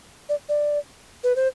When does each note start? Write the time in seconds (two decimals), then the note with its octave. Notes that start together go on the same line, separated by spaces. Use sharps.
0.29 D5
0.49 D5
1.24 B4
1.36 C5